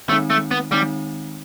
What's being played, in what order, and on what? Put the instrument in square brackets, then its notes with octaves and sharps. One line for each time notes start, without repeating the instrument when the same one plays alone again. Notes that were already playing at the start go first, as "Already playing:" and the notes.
[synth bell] D#3 G#3 C4 D#4 [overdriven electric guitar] A3
[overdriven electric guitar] A3
B3
[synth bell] D#3 G#3 C4 D#4 [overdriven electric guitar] G3